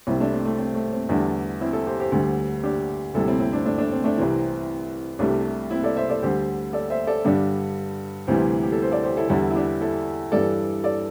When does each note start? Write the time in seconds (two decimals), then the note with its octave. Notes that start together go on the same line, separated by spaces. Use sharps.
0.07 C2 C3 G3 C4 E4
0.20 A3 D4
0.33 C4
0.45 A3
0.59 C4
0.75 A3
0.93 C4
1.09 E2 D3 G3 A3 D4
1.61 C4 E4
1.73 E4 A4
1.87 G4 C5
2.00 G4 C5
2.12 D2 D3 G3
2.64 D4 G4
3.14 D2 C3 G3 E4 A4
3.28 C4 E4
3.40 C4 E4
3.53 A3 D4
3.66 A3 D4
3.78 A3 D4
3.92 C4
4.04 A3 D4
4.17 C2 C3 E3 C4
5.19 C2 C3 G3 A3 D4
5.70 C4 E4
5.83 A4 D5
5.97 C5 E5
6.09 A4 D5
6.22 D2 D3 G3 G4 C5
6.73 A4 D5
6.90 C5 E5
7.07 A4 D5
7.25 G2 D3 G3 D4 G4
8.27 D2 C3 E3 G3 G4 C5
8.63 G4
8.72 A4
8.82 C5
8.92 A4 D5
9.04 G4 C5
9.17 E4 A4
9.29 E2 D3 G3 E4 A4
9.51 E4
9.55 D4 G4
9.81 E4 A4
10.32 G2 E3 G3 A4 D5
10.84 A4 D5